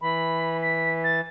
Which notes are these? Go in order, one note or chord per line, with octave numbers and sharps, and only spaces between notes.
E3 B5
B6
A6